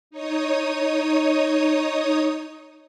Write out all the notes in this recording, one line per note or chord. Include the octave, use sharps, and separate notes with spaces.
D#4 C#5 D#6